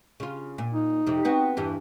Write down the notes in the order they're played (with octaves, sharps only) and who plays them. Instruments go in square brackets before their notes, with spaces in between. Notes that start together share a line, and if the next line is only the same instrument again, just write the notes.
[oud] C#3 F4
A#2
[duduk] D#4
[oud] F2 C3
B3 C4 F#4
E2 G2 E3